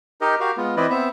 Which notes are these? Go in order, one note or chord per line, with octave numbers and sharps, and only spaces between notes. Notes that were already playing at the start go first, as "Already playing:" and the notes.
D#4 G4 A#4 D#5
F#4 G4 A#4 F5
G#3 B3 F4
E3 C4 E4 B4 D5 D#5
B3 C4 E5